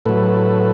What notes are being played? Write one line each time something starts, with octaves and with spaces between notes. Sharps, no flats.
A2 F#3 A4 B4